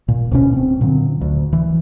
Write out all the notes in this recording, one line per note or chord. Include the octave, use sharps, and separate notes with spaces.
A#2
D1 B2 C#4
C4 C#4
A#2 D3 F#3
D2
E3